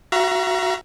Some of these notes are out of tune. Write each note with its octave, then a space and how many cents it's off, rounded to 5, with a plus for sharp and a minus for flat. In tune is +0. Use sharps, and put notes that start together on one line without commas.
F#4 +0 E5 +45 A#5 +25